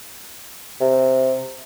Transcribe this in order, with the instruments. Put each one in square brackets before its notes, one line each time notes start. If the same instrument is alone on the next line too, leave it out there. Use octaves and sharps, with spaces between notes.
[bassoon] C3